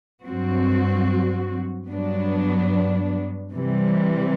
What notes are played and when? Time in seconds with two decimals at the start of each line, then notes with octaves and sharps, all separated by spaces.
0.23 G2 F#3 C4 F#4
1.87 G2 F#3 B3 D4
3.51 C3 E3 G3